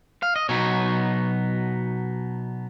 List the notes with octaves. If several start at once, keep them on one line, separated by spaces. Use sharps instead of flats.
F5
D#5
B2 F#3 B3 D#4 C#5